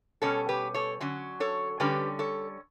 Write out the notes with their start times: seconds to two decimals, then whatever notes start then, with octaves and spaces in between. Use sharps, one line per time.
0.22 B2 G3 C#4 A4 C#5
0.49 G4 B4
0.74 A4 C#5
1.00 D3 F#3 C#4
1.40 A4 C#5
1.80 D3 G3 C#4 G4 B4
2.19 A4 C#5